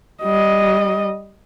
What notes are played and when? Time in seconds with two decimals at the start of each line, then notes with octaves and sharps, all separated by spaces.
0.23 G3 D#5